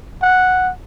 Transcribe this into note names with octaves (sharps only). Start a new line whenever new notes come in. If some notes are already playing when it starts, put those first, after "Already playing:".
F#5